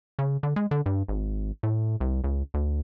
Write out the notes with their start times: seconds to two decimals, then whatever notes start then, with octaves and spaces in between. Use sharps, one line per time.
0.19 C#3
0.43 D3
0.56 G#3
0.71 D3
0.86 G2
1.08 G#1
1.63 A2
2.00 C2
2.24 C#2
2.54 D2